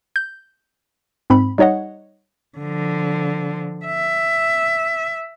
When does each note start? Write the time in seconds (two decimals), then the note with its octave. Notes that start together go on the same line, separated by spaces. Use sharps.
0.16 G6
1.30 G#2 C4 B5
1.58 G3 D#4 C#5 D#5 F#5
2.58 D3 F3
3.86 E5